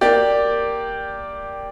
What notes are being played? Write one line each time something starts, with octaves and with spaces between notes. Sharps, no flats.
A#3 G4 D5